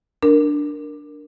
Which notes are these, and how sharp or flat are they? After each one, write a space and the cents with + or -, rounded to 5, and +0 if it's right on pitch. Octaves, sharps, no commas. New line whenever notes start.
D4 +0 A#4 +0